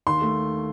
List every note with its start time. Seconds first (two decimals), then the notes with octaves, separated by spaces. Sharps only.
0.07 D#2 C6
0.22 A3